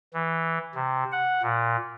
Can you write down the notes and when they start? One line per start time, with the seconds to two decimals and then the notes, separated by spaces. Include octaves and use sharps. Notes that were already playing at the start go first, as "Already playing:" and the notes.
0.14 E3
0.75 C3
1.12 F#5
1.42 A#2